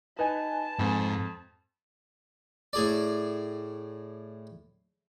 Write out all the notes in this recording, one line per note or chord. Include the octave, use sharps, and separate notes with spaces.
D#4 B4 G#5 A5
F2 G#2
A2 G#4 D5